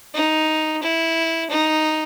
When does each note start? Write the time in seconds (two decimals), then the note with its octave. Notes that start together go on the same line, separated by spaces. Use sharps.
0.15 D#4
0.83 E4
1.50 D#4